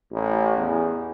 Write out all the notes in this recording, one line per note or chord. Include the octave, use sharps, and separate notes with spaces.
A1
E2